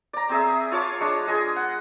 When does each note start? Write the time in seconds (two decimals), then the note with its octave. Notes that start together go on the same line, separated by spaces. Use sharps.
0.13 D5 A#5
0.29 C4 G#4 E5
0.72 F4 C#5 A5 D6
1.01 G#3 D4
1.27 G#4 D#5 G#5
1.56 F#5